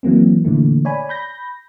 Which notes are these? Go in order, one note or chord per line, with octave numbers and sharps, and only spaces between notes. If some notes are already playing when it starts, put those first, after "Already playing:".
E3 F#3 A#3 C4
A#2 D3 E3 A3
C#5 D5 G#5 B5
B5 G6 A#6